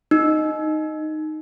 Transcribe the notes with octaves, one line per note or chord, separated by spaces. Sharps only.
D#4